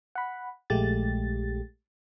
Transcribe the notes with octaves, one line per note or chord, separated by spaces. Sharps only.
F#5 B5
A#1 G#3 A3 G4 A6